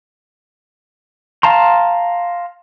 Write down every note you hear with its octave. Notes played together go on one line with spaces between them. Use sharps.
F5 A5 A#5 C6